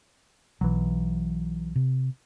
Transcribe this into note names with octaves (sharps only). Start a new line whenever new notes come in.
B1 E3 F#3
C3